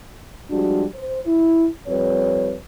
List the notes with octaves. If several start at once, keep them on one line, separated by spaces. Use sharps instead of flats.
F3 G3 G#3 D4 F#4
C5
E4
F2 G3 B4 C#5